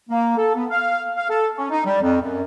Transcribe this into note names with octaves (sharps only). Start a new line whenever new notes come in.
A#3
A4
B3
F5
F5
A4
C#4
D#4
G3
F2
F#2